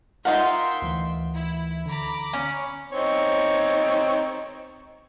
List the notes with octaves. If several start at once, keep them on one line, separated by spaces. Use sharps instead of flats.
D#4 F4 A#4 E5 F#5 G5 C6
D2 E3
E4
D3 A#5 B5 D6
C#4 G#5
C4 D#4 C#5